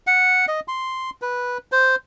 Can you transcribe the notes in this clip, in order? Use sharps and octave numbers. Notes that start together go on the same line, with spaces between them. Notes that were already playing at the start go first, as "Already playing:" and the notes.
F#5
D#5
C6
B4
C5